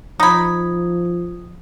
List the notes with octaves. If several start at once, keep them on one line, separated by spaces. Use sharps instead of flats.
F3 D#4 B5 D#6 G#6